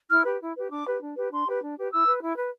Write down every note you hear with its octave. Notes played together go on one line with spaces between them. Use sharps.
E4 F6
G4 B4
E4
G4 B4
D4 D6
G4 B4
D4
G4 B4
D4 C6
G4 B4
D4
G4 B4
E4 E6
B4
E4
B4